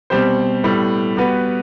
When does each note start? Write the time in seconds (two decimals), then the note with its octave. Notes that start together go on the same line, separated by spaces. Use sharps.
0.10 B2 G3 C4 G4 C5
0.63 A2 G3 B3
1.17 G3 B3 F#4 B4